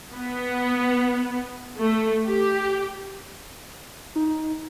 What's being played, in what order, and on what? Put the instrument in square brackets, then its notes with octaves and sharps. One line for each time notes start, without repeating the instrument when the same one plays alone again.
[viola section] B3
A3
G4
[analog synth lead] D#4